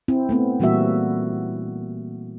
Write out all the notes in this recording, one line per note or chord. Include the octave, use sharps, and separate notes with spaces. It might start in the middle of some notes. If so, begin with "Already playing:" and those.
C4 E4
A3 B3 C4
A#2 E3 G3 A#3 F#4 E5